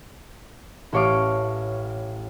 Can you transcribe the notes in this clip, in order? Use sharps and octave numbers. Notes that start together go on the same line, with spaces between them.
A1 A4 C#5 F5 D6